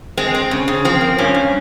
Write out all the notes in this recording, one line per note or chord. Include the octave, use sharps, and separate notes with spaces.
G#3 C4
C4
C#3
C#3
F3 C4
A#3
G2 C#4
G2